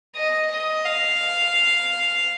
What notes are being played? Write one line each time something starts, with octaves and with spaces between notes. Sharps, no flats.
D#5
D#5
F5